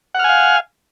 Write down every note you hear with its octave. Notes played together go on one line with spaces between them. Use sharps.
F5 F#5 G#5 F6